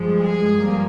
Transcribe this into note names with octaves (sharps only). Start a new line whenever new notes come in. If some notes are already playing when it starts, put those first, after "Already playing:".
Already playing: G2 F3 G#3
G#4
G2 F3 A#3